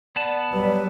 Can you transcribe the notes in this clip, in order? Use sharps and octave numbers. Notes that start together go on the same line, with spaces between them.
B3 D5 F#5 A5
G2 F#3 G3 B4